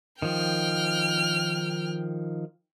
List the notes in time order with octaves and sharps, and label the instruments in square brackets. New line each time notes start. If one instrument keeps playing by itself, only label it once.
[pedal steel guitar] D#3 F3 [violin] G5 F6